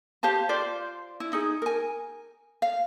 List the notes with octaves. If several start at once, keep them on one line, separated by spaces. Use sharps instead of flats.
G4 C5 F5 A5
F4 C5 D5
E4
D#4 G#4
A#4 G#5
F5